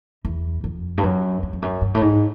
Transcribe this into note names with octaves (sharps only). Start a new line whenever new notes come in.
E2
F2
G2
F#2
F2
F2
F#2
G2
A2
G#2